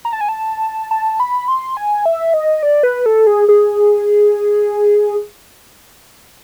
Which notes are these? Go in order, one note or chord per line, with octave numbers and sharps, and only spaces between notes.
A#5
A5
G#5
A5
A5
B5
C6
G#5
E5
D#5
D5
B4
A4
G#4
G#4